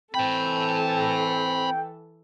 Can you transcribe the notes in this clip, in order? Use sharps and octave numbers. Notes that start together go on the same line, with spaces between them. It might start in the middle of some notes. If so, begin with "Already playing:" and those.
E3 C4 A4 G5 A5 B5